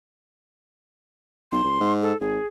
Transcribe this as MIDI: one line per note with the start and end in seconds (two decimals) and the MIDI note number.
1.52 1.63 35
1.52 1.93 84
1.64 1.77 37
1.80 2.13 44
2.02 2.19 69
2.21 2.38 32
2.21 2.47 68